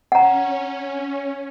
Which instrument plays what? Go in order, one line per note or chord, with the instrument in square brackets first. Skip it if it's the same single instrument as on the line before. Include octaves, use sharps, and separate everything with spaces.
[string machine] C#4 [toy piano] F#5 A#5